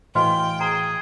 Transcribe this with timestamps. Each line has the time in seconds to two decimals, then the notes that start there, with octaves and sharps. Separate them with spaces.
0.15 A2 E3 F#4 D#5 F5 G5 F6
0.61 G#4 A#5